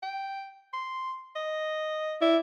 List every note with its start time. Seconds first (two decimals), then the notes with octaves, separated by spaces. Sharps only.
0.03 G5
0.73 C6
1.36 D#5
2.21 E4 D5